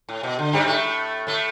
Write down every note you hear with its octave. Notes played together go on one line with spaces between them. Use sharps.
A2
B2
D3
G2 G3
A2 A3
A2 A3